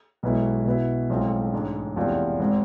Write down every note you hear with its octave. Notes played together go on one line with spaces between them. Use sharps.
B1 B2 G#3 B3 E4
B2 B3 E4
B1 A2 F3 G#3 C4
A1 G#2 G#3 D4
F1 E2 C3 F3
G#1 G#3 C4